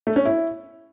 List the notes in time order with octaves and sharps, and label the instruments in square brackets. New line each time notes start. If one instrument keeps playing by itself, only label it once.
[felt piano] A3
C#4
E4